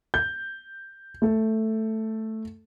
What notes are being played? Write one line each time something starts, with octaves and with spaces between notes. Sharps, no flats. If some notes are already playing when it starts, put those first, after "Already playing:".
G6
A3 A4